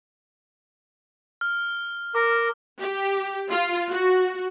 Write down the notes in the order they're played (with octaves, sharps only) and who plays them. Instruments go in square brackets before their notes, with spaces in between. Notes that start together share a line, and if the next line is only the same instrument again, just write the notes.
[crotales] F6
[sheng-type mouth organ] A#4 [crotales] D6
[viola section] G4
F4
F#4